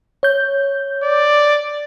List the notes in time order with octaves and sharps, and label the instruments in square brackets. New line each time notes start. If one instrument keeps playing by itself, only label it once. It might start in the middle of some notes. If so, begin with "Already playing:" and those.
[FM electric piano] C#5 G6
[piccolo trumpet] D5